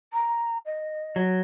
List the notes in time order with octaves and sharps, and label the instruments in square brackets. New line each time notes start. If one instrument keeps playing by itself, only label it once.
[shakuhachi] A#5
D#5
[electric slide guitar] F#3